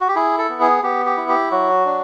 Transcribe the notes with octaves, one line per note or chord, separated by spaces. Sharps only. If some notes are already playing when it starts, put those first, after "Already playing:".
F#4
G4
E4 G#4
A4
B3
G#4
B3 G4
G4
E4
G4
F#3 F#4
D4